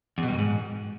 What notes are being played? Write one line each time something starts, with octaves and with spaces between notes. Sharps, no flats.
E2
B2
G3
F#2
G#2